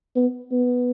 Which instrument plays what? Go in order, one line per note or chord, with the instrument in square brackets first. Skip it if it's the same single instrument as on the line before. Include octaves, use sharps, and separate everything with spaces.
[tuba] B3
B3